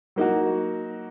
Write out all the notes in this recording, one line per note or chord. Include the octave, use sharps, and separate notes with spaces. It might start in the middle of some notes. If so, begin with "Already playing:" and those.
F#3 A#3 D#4 F#4